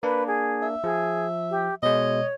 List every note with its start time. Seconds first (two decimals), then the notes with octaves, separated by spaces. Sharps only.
0.03 A#3 D4 B4
0.27 G#4
0.63 E5
0.84 F3 G#4
1.51 G4
1.83 B2 G#3 C#5 D#5